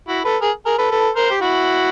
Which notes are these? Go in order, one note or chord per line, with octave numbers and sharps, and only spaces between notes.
E4 F#4
A4 B4
G#4 A#4
G#4 A#4
A4 B4
A4 B4
A#4 C5
G4
E4 F#4